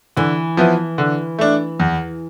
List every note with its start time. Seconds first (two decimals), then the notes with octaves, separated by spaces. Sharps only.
0.17 D3 E3
0.57 F3 B3 E4
0.98 D3
1.39 A3 D4
1.80 E2